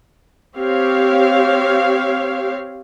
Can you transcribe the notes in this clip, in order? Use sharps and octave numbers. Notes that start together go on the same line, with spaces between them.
C4 G4 C#5 F5